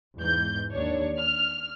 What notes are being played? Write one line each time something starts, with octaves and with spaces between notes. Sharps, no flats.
E2 G#2 G6
D#2 D4 C#5
F6